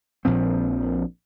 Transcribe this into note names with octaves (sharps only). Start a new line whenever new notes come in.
A#1 A#2 F3 C4